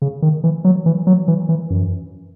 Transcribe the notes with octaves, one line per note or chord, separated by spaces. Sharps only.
C#3
D#3
E3
F#3
E3
F#3
E3
E3
F#2